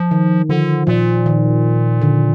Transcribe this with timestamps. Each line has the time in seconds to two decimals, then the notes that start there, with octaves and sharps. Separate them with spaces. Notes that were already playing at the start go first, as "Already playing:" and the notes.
Already playing: F3
0.11 D#3
0.49 D3 F3
0.87 A#2 F3
1.26 D#3
2.02 D3